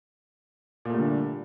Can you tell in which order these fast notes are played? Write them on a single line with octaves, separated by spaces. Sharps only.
A#2 A3 G3 D3